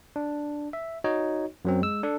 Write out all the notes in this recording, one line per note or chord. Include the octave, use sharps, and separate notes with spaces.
D4
E5
D#4 F#4 C#5 D#5
F#2 F#3 C4
G#3 E6
D4 A4